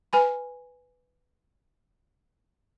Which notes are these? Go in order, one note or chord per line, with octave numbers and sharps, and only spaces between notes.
B4 G#5 B5